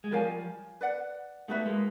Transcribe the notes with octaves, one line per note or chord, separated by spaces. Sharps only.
G#3
F3 G3 A#4 C#5 F5 G#5
B4 D5 F#5
G3 A3 D#4 F#4 B4 E5
G#3 A#3